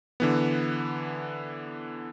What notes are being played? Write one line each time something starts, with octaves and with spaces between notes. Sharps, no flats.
D3 E3 B3